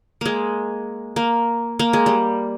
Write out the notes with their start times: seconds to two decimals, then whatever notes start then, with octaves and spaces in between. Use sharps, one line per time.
0.21 G#3 A#3
1.16 A#3
1.79 A#3
1.93 G#3
2.06 G3